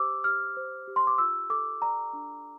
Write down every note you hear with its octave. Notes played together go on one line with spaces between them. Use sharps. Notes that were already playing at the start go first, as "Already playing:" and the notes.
Already playing: G4 C5 D6 E6
G4 F6
C5
G4
C6
D6
F4 E6
A4 D6
D5 A#5
D4